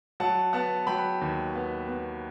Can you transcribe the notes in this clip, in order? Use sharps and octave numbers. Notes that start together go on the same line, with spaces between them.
F#3 F#5 A5
B3 F#5 A5
F#3 G5 B5
D#2
B3
B3